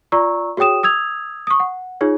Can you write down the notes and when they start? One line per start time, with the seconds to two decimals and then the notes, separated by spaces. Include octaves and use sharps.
0.12 F4 D5 A#5 C#6 E6
0.57 F#4 G#4 C#5 G5 D#6 E7
0.83 D#6 E6 G#6 F7
1.47 C#6 D#6
1.60 F#5
2.01 D#4 F4 G#4 C#5